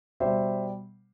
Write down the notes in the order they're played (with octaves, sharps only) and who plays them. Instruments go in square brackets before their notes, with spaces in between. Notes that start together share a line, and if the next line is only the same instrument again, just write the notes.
[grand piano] B2 G3 C5 E5